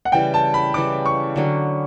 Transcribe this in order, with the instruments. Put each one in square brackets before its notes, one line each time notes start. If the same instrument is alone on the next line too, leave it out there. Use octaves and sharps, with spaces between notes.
[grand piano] F#5
[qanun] C#3 E3 G3 [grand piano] G5
[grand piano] A5
B5
[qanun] C#3 E3 G3 [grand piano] D6
[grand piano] C#6
[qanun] D3 F#3 C#4